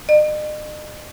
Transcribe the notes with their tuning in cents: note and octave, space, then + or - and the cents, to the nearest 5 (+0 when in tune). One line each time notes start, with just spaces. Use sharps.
D#5 -45